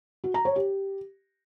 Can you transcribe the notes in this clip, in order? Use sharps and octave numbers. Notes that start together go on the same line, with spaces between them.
F#4
A#5
C#5
G4